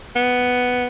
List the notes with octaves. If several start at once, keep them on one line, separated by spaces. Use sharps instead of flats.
B3